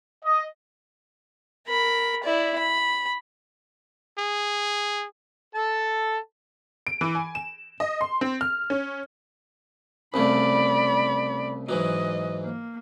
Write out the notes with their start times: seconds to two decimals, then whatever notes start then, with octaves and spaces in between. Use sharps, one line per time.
0.24 D#5
1.67 A#4 B5
2.23 E4 D5
2.58 B5
4.18 G#4
5.55 A4 A5
6.87 D7
7.01 E3
7.15 G#5
7.35 E7
7.80 D#5
8.01 C6
8.21 C4
8.41 F6
8.70 C#4
10.14 C2 C#3 A3 D5 B5
11.69 G#2 E3 F#3 D#5
12.44 A#3